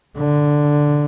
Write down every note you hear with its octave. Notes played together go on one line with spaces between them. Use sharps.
D3